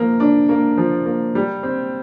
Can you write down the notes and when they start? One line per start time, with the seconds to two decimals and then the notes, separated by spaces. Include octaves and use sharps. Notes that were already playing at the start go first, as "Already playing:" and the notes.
Already playing: F3 A#3
0.20 D4
0.49 A#3
0.78 F3
1.06 A#3
1.35 G3
1.63 C4